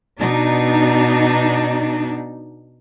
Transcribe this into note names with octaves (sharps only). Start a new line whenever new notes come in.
B2 D4 D#4